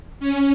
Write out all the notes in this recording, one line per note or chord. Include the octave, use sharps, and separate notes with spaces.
C#4